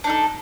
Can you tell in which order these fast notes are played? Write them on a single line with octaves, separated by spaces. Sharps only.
D4 D#4 A4